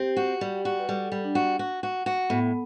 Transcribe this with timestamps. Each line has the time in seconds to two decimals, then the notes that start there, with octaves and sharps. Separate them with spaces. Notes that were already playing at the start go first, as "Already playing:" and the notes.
Already playing: C4 G4
0.17 F#4
0.41 G3
0.65 F#4
0.79 B4
0.88 G3 A4
1.12 G3
1.24 D4
1.35 F#4
1.59 F#4
1.83 F#4
2.06 F#4
2.30 A2 B3